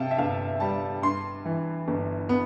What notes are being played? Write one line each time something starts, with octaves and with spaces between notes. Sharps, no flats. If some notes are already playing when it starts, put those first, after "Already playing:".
Already playing: C3 F5 G5 A5
E5
G1 F5
G3 A5
G2 C6
E3
G1
B3